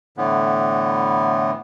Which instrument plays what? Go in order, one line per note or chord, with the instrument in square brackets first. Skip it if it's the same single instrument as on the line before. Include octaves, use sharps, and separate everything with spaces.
[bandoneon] A2 D3 E3 B3